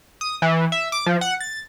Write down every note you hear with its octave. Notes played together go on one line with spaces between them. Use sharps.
D#6
E3
E5
D6
F3
F#5
A6